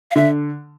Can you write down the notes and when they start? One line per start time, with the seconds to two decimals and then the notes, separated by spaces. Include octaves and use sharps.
0.11 F5
0.16 D3 E5